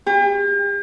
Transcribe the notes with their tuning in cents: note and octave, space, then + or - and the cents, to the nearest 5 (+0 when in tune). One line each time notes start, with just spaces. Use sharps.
G4 +40